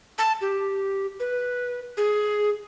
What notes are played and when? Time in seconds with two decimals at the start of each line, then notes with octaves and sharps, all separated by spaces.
0.18 A5
0.41 G4
1.20 B4
1.97 G#4